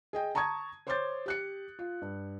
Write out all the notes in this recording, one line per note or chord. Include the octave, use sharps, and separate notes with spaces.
G#4 D#5 G5
A5 A#5 C#6 D#6 G#6
C5 C#5 C6 D6 G6 A6
G4 F#6 C#7
F4
G2